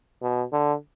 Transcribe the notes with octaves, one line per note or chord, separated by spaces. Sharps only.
B2
D3